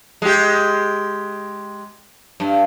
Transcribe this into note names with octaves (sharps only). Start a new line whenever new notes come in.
G#3 G4
G2